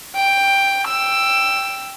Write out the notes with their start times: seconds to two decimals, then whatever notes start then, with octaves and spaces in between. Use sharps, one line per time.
0.16 G5
0.88 G5 E6